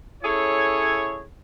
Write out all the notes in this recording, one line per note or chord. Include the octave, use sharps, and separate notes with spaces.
C#4 E4 G#4 A4 C#5